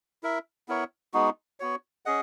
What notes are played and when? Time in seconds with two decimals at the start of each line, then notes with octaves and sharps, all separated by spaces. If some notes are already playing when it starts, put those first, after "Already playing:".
0.23 E4 A#4 E5
0.68 B3 E4 A#4 C#5
1.13 G#3 B3 D#4 F#4
1.60 B3 F#4 C#5
2.05 C#4 G#4 D#5 F#5